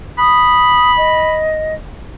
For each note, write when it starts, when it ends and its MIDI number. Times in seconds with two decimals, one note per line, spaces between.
0.18 1.40 83
0.18 0.95 87
0.97 1.74 75